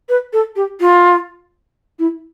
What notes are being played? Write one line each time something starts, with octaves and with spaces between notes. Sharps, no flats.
B4
A4
G4
F4
E4